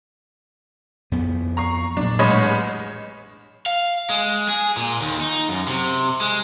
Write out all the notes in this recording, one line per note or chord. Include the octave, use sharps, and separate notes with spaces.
F2 B3
A#5 C#6 C7
A#2 F#3 D4
A1 G#3 C#5 D#5 B5
F5
G#3
G#4
A#2
D#2
D#4
F#2
C3
G#3